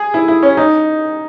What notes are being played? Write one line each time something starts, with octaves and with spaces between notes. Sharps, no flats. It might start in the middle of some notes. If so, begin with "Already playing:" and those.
Already playing: G#4
E4
E4
C#4
D#4